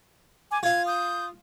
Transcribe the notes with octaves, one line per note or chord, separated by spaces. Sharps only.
G#5 D6
F4 F5 G#6
D#6 G6